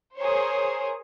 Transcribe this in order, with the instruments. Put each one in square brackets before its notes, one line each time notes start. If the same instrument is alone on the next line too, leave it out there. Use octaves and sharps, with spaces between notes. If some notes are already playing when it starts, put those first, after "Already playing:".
[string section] G#4 A#4 C5 C#5